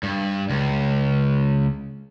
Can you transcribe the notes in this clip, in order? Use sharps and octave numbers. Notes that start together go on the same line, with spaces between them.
G2
C#2